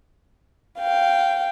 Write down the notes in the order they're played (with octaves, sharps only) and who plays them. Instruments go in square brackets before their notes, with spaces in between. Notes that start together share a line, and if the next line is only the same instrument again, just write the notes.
[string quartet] F5 G5